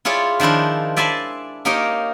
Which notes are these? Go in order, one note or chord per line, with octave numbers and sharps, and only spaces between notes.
E4 F4 G#4 C#5 D5
D#3 F3 D4 E4 C5
D5 E5 G#5 A5 B5 C6
A#3 D#4 G4 A#4 C#5 D#5